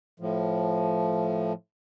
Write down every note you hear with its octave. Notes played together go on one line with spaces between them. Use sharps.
A2 F3